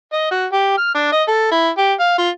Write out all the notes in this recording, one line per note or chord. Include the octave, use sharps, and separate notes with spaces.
D#5
F#4
G4
F6
D4
D#5
A4
E4
G4
F5
F4